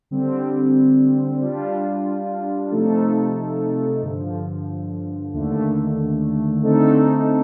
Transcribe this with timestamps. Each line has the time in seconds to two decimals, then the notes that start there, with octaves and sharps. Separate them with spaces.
0.11 D3 G3 C4
1.41 G3 D4 F4
2.71 C3 F3 A3 D#4 A4
4.02 G2 D3 F3
5.33 D#2 D3 A3
6.63 D3 A3 C4 D#4 A4